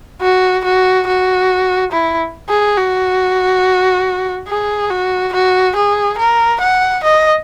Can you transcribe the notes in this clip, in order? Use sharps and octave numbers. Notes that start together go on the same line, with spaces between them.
F#4
F#4
F#4
E4
G#4
F#4
G#4
F#4
F#4
G#4
A#4
F#5
D#5